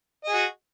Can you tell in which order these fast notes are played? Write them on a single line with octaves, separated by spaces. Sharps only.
D#5 G#4 F#4